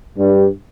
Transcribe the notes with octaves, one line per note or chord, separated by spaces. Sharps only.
G2